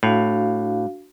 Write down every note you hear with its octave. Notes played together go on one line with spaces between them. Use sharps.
A2 D4 F#4 F5